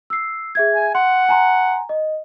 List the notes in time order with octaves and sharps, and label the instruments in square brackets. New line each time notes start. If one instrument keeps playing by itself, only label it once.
[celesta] E6 C7
G#4 E5 G#6
[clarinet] G#5
[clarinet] F#5 [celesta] C6
[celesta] G#5 A#5 C6
D#5